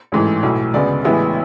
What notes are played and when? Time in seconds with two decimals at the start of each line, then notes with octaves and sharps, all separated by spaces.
0.12 A1 G#2 E3 A3
0.43 B1 A2 E3 A3
0.74 D2 C#3 G#3 B3 D5
1.04 A1 A2 E3 G#3 B3 E5